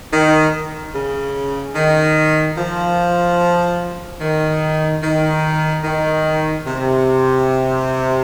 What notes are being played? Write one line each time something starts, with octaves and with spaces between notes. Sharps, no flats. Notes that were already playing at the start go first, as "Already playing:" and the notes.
D#3
C#3
D#3
F3
D#3
D#3
D#3
C3